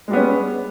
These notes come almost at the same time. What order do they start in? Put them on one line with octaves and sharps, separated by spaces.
G#3 G3 B3 C#4